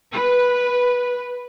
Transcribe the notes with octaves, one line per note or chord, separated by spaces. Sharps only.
B4